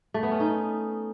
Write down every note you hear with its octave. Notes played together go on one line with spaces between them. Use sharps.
A3
B3
C#4
D#4